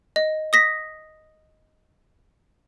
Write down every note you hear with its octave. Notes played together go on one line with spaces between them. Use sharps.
D#5
D#6 A#6 B6